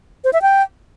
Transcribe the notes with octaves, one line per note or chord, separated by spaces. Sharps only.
C5
E5
G5